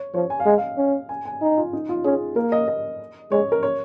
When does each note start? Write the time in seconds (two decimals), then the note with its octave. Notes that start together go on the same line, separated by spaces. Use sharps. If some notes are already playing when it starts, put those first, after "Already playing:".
Already playing: C#5
0.14 F3 C#5
0.30 G#5
0.40 F5
0.46 G#3 D#5
0.58 F5
0.78 C#4
1.09 G#5
1.25 G#5
1.42 D#4
1.57 F4
1.73 D#4
1.89 F4
2.04 C#4 G#4
2.36 A#3 A#4
2.52 D#5
2.68 D#5
3.31 G#3 C#5
3.52 A#4
3.63 C#5